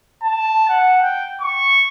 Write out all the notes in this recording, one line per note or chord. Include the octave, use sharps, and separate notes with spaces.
A5
F#5
G5
C#6